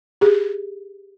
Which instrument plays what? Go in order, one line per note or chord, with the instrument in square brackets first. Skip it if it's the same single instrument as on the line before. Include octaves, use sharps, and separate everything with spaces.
[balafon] G4 G#4